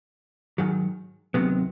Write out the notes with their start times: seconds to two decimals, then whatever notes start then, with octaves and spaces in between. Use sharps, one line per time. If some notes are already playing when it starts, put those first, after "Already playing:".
0.58 G#2 D#3 F#3
1.34 D2 C3 D#3 F#3 B3